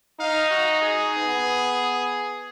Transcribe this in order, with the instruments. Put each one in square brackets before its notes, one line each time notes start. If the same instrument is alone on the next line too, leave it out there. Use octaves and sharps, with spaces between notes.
[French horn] D#4 [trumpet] F5
[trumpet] F#4
G#4
[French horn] B3